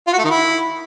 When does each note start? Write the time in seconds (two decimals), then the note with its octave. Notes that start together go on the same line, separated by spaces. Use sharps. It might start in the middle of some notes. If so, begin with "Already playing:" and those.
0.07 F4
0.13 F#4
0.19 A3
0.24 D#3
0.30 E4